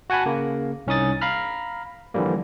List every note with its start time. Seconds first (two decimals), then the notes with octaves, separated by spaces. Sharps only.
0.10 F#4 F#5 G#5 A5 B5
0.26 C#3 A#3
0.87 C2 C#4 D#4 D#6 A6
1.21 F5 A#5 B5 F6
2.14 D3 E3 F3 G3 A#3